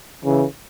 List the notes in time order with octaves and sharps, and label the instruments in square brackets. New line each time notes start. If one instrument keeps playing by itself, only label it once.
[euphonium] C#3 [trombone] E3